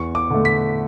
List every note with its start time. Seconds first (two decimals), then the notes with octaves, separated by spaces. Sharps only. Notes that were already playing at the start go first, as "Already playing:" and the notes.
Already playing: E2 C#6
0.15 D6
0.30 D3 A3
0.45 B6